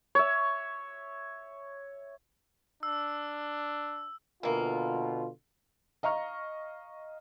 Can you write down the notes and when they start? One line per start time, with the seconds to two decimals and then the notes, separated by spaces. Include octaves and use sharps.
0.15 C#5 E5
2.83 D4 E6
4.43 B2 D3 E3 A#3 F4
6.03 D#5 F5 A#5 C#6 F6